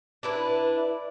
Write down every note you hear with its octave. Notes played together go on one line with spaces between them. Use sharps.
D4 E4 B4